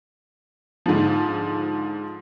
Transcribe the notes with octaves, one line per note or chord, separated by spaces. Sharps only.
G#2 D3 F3